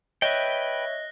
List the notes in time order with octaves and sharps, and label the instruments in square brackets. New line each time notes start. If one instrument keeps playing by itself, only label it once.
[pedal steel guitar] B4 G5 [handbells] C#5 E5 [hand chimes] D#5 [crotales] F#6 A#6 G7